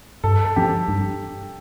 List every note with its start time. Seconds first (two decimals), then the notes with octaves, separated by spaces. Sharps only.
0.24 G2 A4
0.45 A4
0.56 F3 C4 G4
0.88 G2